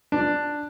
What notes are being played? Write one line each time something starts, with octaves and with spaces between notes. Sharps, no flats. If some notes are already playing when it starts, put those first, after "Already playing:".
D4